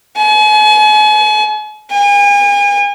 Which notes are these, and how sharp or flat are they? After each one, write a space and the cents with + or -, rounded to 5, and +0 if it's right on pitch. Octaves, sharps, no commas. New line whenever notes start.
G#5 +40
G#5 -40